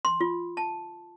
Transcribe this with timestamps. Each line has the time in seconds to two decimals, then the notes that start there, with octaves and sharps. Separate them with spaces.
0.05 C6
0.21 F4
0.57 A5